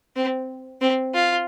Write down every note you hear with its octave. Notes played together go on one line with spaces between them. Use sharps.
C4
C4
F4